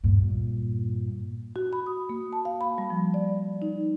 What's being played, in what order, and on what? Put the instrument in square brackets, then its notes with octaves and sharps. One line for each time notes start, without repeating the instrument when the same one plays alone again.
[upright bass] G2 A#2
[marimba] F#4
B5
D#6
A#3
A5
F5
B5
G3
F3
D5
D#4